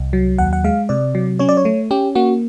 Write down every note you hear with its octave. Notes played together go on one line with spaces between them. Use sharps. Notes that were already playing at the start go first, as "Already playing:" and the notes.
Already playing: C2
F#3
D#2 F#5
F#5
G#3 F5
C3 D5
F#3
C#4 C#5
D5
C#5
A3
C#4 G4
A#3 F#4